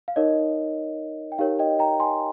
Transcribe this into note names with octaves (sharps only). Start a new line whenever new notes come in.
F5
D#4 A#4 C#5 D#5
G5
D#4 G4 A#4 C#5 F5
D#5 G5
G5 A#5
G#5 C6